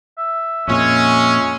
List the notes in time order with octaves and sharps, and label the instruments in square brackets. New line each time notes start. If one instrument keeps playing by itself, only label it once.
[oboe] E5
[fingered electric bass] F2 A#2 [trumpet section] G#3 C#4